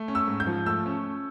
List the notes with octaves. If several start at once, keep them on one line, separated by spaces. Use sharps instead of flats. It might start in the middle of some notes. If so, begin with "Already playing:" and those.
Already playing: A3
C#4
E6
G#2
G6
F3
A3 E6
C#4